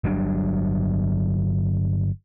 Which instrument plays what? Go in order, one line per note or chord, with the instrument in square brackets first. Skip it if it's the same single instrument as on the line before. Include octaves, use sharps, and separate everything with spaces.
[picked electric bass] G1 F#3 G3 D4